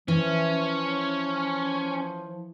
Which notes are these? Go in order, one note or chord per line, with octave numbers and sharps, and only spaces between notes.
E3 F3 C#4